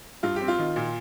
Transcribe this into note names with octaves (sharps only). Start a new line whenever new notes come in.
G2 F4
C4 G4
F4
D#3
A#2